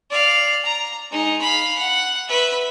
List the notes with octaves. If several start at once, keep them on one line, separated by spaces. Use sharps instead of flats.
D5 F5
A#5
G#3 D#4
F5 B5
F#5
B4 E5